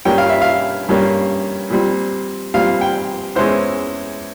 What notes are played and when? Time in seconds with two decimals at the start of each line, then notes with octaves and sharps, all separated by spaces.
0.05 G2 G3 A#3 C#4 G5
0.18 F5
0.29 E5
0.42 F5
0.89 G2 G3 A#3 C#4
1.70 A#2 G3 C4
2.54 A#2 G3 C4 F5
2.81 G5
3.36 E2 E3 G#3 C#4 C5